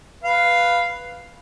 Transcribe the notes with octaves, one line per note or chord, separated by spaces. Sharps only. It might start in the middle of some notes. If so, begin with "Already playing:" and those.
B4 F5